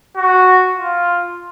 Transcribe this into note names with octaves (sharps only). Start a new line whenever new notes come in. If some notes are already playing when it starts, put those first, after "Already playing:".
F#4
F4